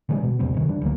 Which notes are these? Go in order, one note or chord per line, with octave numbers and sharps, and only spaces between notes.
D3 E3 G3 G#3
B2
E2 C3 G3 C4
F#2 C3 D#3
E3 G3 D4
D2 F#3 A#3